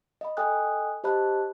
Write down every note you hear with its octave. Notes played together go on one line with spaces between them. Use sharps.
D#5 B5
A4 D#5 G5 G#5 D#6 F#6
G4 C5 D#5 A5 B5 F#6